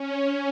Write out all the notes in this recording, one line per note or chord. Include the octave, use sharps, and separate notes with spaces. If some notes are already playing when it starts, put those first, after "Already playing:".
Already playing: C#4